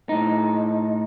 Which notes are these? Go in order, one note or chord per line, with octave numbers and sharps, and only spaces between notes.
A2 D#4